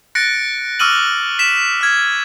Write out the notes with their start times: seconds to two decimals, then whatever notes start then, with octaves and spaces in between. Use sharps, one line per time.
0.15 F#6 A6 A#6 C#7 D7
0.79 C#6 D6 E6 F6 D#7 F#7
1.39 B6 E7
1.81 F6 G#6